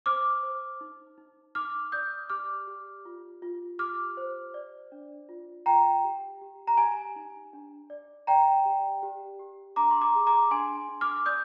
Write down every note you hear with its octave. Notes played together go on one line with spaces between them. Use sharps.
C5 D6 F6
C5
D#4
D#4
D#4 D6 F6
D5 D#6 G6
G4 D6 F6
G4
F4
F4
G4 D6 F6
C5
D5
D4
F4
F4 G5 A#5
G4
G4
A#5
G4 G#5
D#4
D4
D5
D5 G5 A#5
G4
G4
G4
D4 A#5 D6
C6
A#5 D6
G#4
A#5 D6
D4 G#5 C6
D4
D6 F6
D5 D#6 G6